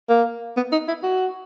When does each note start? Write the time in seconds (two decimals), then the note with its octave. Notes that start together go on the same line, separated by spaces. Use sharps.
0.09 A#3
0.57 B3
0.72 D#4
0.88 E4
1.03 F#4